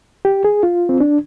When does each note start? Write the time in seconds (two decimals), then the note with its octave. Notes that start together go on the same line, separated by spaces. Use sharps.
0.25 G4
0.44 G#4
0.63 F4
0.89 C4
1.00 D4